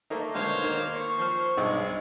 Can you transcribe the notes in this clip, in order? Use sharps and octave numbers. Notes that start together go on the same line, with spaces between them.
A3 A#3 D#4
B2 D3 G#3 C5 C#5 F5
D#3 A#3
C#6
F3 C5 F6
B1 G2 G#3 D#4 D#5